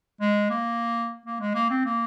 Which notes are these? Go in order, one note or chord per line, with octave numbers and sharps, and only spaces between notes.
G#3
A#3
A#3
G#3
A#3
C4
A#3